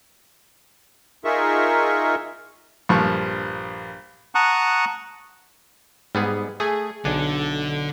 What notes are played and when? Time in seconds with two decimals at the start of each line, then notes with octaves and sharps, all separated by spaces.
1.25 D#4 F4 G#4 A#4 E5 C#6
2.89 A#1 G2 F3 C#6
4.35 F#5 A5 A#5 C#6 D#6 F#6
6.15 G#2 G3 B3 G#4
6.60 A3 G#4
7.05 B1 D3 D4 G#5